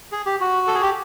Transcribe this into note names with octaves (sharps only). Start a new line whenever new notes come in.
G#4
G4
F#4
A4
G#4
G4